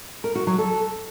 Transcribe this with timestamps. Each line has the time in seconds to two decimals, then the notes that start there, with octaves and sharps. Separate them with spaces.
0.24 A#4
0.35 F#4
0.47 F#3
0.58 A4